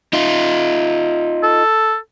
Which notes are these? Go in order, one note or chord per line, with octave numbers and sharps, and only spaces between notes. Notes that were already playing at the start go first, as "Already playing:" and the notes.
D#4 F4
A4